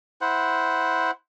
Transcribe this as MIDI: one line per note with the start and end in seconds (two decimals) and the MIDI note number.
0.21 1.11 64
0.21 1.11 72
0.21 1.11 78